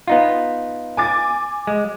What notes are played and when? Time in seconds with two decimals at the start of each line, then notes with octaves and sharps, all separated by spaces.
0.08 B3 D#4 F4
0.97 G#5 D6 A6
1.67 G#3